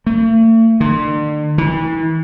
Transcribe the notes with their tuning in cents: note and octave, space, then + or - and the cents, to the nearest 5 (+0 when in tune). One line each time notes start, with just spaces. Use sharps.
A3 +45
D3 +40
E3 -35